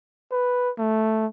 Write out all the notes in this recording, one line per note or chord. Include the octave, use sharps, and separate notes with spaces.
B4
A3